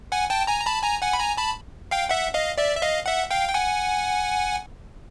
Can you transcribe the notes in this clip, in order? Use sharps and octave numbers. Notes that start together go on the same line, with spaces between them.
F#5 G#5
G5 A5
G#5 A#5
A#5
A5 B5
G#5 A#5
F#5 G#5
B5
G#5 A#5
A5 B5
F5 G5
E5 F#5
D#5 F5
D5 E5
E5
D#5 F5
E5 F#5
F5 G5
G5
F#5 G#5